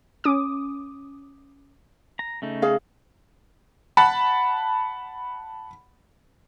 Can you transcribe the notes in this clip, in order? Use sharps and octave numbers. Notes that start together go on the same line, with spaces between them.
C#4 D6 D#6
A#5
C#3 A3 D#4
G#4 F5
F#5 A5 B5